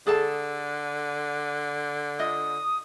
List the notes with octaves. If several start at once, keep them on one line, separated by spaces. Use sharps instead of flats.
D3 G#4 A4 A5
F4 D#5 D#6